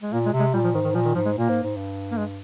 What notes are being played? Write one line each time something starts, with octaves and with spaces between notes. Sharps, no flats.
G#3
A#2 A#3
G#3
C3
G#3
A#2 G3
F3
G#2 D#3
D#3
A#2 F3
D#3
G#2 F3
G#3
A#2 A#3
G#2
G#2
G2
A#3
G#3